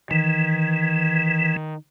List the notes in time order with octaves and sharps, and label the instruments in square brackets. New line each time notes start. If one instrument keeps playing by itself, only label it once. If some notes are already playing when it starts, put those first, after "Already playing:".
[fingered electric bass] D#3 [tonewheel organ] E3